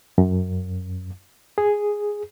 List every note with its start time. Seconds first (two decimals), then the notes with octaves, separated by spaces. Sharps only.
0.18 F#2
1.58 G#4